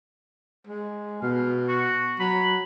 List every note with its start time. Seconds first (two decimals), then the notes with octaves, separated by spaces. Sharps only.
0.67 G#3
1.22 B2 F5
1.68 F#4
2.19 F#3 B5